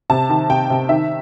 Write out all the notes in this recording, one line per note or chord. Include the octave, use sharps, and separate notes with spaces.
C3 A5
D#3
C3 G5
C3
D#3 E5